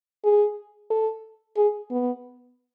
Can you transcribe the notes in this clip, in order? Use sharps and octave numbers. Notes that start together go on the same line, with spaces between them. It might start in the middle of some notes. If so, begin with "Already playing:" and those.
G#4
A4
G#4
B3